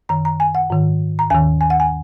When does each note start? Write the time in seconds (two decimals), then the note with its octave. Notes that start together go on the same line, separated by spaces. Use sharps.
0.09 F#2 D#3 A#5
0.25 A#5
0.40 G#5
0.55 F#5
0.70 G#2 D#3
1.19 A#5
1.30 D#2 D#3 G#5
1.61 G#5
1.70 F#5
1.80 G#5